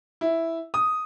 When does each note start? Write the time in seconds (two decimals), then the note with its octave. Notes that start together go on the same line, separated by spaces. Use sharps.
0.21 E4
0.74 D#6